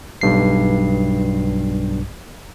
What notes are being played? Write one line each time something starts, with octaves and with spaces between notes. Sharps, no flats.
B1 G2 C7